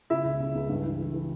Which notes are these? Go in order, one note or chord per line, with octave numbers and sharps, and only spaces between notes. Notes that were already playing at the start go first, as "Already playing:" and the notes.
C#3 E4 E5
C#2
C#3
C#2
G2
E3
E3
E3